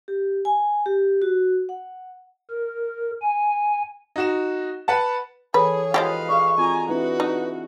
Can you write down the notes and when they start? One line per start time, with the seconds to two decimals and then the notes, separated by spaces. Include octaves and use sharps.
0.08 G4
0.45 G#5
0.86 G4
1.22 F#4
1.69 F#5
2.50 A#4
3.22 G#5
4.16 D#4 F#4 E7
4.88 B4 F#5 A5
5.54 E3 G#4 A4 B4 C#5
5.94 F3 G#3 F#4 G4 B4 D#5 F5
6.29 G#4 D5 C#6
6.58 C4 F4 F#4 G#5 A#5
6.89 C4 D4 E4 F#4 B4
7.20 D#4